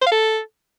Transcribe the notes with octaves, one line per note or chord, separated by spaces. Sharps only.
C5
F5
A4